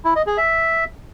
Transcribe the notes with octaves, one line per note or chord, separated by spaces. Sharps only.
E4
D#5
G#4
E5